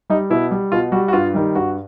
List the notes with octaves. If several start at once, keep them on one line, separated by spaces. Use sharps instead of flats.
G3 D#4
B2 E4
G3
B2 F4
G3 F#4
F#4
G2 F4
D#3 G3
G2 F#4